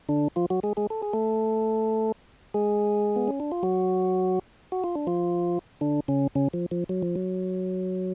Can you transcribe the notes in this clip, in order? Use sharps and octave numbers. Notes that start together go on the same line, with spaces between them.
D3 D4
F3 F4
F#3 F#4
G#3 G#4
G#3 G#4
A4
G#4
A3 A4
G#3 G#4
B3
C#4
D4
F4
F#3 F#4
F#4
F4
D4
F3 F4
D3 D4
C#3 C#4
C#3 C#4
F3
F3
F#3
F3
F#3